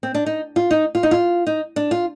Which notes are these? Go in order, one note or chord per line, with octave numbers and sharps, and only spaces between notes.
C4
D4
D#4
F4
D#4
F4
D#4
F4
D#4
D4
F4